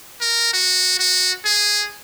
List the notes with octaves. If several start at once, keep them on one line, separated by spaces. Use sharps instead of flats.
A#4
F#4
F#4
G#4